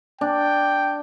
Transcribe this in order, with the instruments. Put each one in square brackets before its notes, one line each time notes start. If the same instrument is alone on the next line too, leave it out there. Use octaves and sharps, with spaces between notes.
[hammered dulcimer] D4 [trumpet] G5